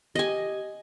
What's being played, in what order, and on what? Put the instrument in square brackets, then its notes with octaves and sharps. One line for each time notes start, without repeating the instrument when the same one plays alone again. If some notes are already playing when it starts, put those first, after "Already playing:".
[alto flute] G4 [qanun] D#5 G#5